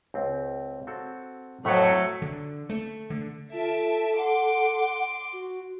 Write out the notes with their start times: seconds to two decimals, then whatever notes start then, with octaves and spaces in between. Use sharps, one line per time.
0.14 C#2 C4
0.87 C4 F#4 A4
1.65 F2 A2 F#3 A3
2.22 D3
2.69 A3
3.10 D3
3.53 F4 A4 E5 A5 D7
4.18 F#5 C6 D6
5.33 F#4